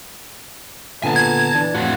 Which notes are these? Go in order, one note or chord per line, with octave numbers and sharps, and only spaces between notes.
A#2 D3 B3 G#5 A5
G#6
E3 D4
F2 A2 E4 F#4